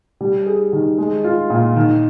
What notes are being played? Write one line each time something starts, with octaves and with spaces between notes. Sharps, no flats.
G3
G#4
D#3
G#3
F4
A#2
D#3